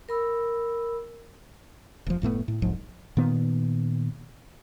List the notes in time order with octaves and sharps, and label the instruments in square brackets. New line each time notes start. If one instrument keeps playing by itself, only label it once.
[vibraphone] A#4 B5 E6
[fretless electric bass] E1 F3
F#1 A2 A3 B3
A2
D#1 B1 G#2 F3
A#2 D#3 B3